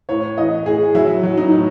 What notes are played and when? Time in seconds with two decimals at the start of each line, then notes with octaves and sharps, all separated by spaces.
0.09 A2 C#5
0.38 E3 D#5
0.66 A2 G#4
0.95 F#3 E4
1.23 F#3
1.37 D#4
1.52 A2